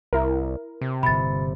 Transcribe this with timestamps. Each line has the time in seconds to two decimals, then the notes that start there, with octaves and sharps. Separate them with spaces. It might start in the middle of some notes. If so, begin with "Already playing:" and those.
0.13 C2 E4 A#4
0.81 C3
1.03 G1 A#2 B5 A6